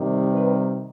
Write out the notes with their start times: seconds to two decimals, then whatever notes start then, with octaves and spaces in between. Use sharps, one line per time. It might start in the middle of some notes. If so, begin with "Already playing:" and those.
Already playing: C3 D#3 G3
0.32 B4